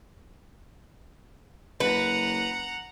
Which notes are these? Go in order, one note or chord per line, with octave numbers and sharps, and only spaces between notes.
F#1 B4 F#5 A#5